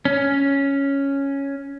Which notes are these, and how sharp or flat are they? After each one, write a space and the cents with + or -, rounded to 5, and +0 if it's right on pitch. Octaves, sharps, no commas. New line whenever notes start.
C#4 +0